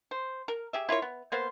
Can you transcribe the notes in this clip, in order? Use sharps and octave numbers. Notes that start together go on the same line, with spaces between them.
C5
A#4
G4 G#4 E5
E4 F4 A#4 C#5
B3
A#3 B3 C5 F5